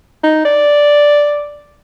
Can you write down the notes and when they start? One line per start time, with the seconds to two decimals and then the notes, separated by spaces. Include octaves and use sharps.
0.24 D#4
0.45 D5